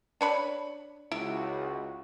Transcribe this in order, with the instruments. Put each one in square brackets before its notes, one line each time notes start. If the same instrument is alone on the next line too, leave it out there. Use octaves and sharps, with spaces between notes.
[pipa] D4 C#5 B5
[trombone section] C#2 F#4 [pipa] E4